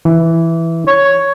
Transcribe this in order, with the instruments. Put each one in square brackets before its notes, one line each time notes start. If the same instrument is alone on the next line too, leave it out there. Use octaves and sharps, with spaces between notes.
[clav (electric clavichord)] E3
[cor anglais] C#5